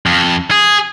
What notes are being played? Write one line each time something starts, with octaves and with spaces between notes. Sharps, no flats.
F2
G#4